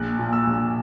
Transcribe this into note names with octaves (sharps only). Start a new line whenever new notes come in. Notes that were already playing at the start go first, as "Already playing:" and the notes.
Already playing: A#1 F#6
A#2
E6
A#1